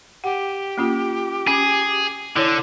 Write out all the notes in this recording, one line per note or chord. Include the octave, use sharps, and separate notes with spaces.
G4 F#5
A#3 C#4 F4
C#4 G#4
D3 E4 C#5